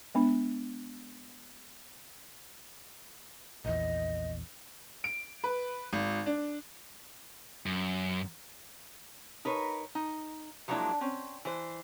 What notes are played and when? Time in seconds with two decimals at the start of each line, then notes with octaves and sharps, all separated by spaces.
0.14 G#3 B3 D4
3.64 A#1 E2 D#5
5.04 D7
5.44 B4
5.93 G#1
6.26 D4
7.66 F#2
9.45 D#4 A#4 B4 C#5
9.95 D#4
10.68 F3 F#3 G#3 A#3 D4 E4
11.01 C4 C#4
11.45 E3 C5